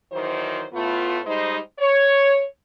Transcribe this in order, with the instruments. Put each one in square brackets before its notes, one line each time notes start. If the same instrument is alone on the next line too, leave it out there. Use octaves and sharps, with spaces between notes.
[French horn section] D#3 E3 F#3 C5
A2 A3 B3 F4
G3 G#3 D#4 C5
C#5